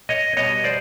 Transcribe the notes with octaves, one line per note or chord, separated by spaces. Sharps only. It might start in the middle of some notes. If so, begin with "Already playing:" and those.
C#5 D#5
B2 G3 B3 C#5 D#5
C5 D5